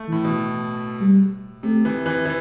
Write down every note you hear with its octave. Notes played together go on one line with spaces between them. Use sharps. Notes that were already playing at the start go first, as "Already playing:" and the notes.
Already playing: A3
A2 E3
B2
G3
C3 A3
E3
E3
E3